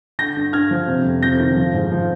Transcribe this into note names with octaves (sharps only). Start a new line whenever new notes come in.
D3 G6 A#6
G2
G2 F6 G#6
F3
C3
F2
F2 G6 A#6
D#3
F3
G#2
F3